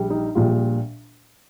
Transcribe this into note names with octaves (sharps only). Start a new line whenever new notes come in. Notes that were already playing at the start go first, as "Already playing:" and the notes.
Already playing: A#1 G3
D#4
A#1 A#2 G3 F4